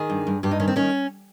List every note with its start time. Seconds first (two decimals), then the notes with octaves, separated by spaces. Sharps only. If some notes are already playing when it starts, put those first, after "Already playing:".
Already playing: D#3 G#4
0.10 G2
0.27 G2
0.43 G2 G4
0.51 D#4
0.60 D#3 C#4
0.68 C4
0.76 D#3 C#4